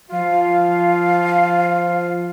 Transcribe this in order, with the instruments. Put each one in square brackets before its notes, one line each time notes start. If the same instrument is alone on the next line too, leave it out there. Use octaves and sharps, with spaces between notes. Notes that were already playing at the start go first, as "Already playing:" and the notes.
[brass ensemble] F3 F4 [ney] F5